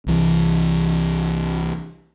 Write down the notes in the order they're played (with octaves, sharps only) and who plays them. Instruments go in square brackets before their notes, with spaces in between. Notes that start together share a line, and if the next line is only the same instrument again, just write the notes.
[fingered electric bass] C2 E3